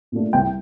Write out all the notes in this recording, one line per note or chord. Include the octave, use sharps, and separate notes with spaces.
A#2 A3 D4
C2 G5